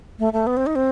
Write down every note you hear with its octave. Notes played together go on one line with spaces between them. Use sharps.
A3
A3
B3
C4
D#4
C4